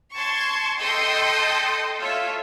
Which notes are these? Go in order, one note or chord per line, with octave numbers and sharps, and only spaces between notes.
A5 C6 C#6 G#6
A4 D#5 G5 C6 G6
F4 A4 C#5 E5